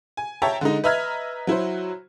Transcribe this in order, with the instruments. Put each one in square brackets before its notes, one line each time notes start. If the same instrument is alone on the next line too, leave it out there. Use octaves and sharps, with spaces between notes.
[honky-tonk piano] G#5
C#5 E5 G5 A5 A#5
D3 G#3 D#4
B4 D#5 E5 A#5 F6 G#6
F#3 E4 F#4 C5